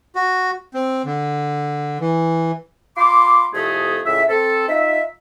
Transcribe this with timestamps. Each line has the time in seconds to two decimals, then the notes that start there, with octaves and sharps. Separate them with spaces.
0.15 F#4
0.74 C4
1.05 D3
2.00 E3
2.97 F4 B5 C6 D6
3.54 C2 F2 A3 G#4 D#6
4.06 C#2 A2 E5
4.29 C4 A4
4.69 D#4 F4 E5